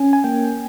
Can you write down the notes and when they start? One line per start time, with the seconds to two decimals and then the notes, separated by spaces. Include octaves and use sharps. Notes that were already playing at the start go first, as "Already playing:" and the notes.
Already playing: C#4 G#5
0.13 G#5
0.24 A#3 G5